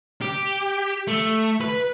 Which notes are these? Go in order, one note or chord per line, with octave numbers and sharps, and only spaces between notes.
G4
A3
B4